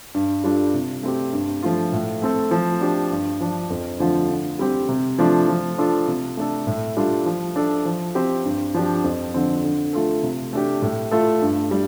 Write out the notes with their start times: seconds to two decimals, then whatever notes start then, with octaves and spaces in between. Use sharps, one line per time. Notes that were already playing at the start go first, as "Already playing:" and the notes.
0.15 G2
0.44 G3 D4 F4 A4
0.74 C3
1.03 A3 C4 G4
1.33 G2
1.63 F3 A3 F4
1.92 A2
2.22 A3 C4 A4
2.51 F3
2.81 D4 G4
3.11 G2
3.41 F3 D4
3.70 F2
4.00 D3 F3 A3 F4
4.30 D3
4.59 G3 C4 G4
4.89 C3
5.19 F3 A3 D4 F4
5.48 F3
5.78 D4 F4 A4
6.08 C3
6.37 A3 D4 A4
6.67 A2
6.97 G3 D4 F4 A4
7.26 F3
7.56 D4 A4
7.85 F3
8.15 C4 G4
8.45 G2
8.74 F3 D4 G4
9.04 F2
9.34 D3 F3 C4
9.64 D3
9.93 A3 F4 A4
10.23 C3
10.53 A3 D4 G4
10.82 A2
11.11 A3 F4 A4
11.42 G2
11.71 G3